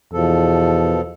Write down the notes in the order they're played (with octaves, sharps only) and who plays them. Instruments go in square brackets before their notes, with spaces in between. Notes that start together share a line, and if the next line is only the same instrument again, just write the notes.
[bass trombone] E2 [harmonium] B2 F3 A4